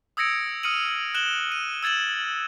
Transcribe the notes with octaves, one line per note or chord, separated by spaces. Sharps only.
D#6 E6 G#6 A#6 C#7 D7
D#6 F6 C#7 D#7 F#7
F#6 E7 F#7 G7
D#7
E6 G#6 A6 E7 F#7